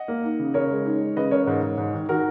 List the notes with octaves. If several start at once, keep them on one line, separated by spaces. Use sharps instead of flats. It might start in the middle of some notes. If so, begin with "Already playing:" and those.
Already playing: D#5 F#5
A#3
D#4
C#3
C#3 A#4 C#5
G#3
D#4
G#3
C#3 B4 D#5
C#3 A#4 C#5
G#2
G#2
G#2
D#3
D#3 F#4 A#4